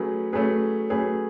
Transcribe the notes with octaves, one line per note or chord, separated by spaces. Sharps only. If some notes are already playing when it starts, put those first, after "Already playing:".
Already playing: F#3 A3 C#4 G#4 B4
F#3 A3 C#4 G#4 B4
F#3 A3 C#4 G#4 B4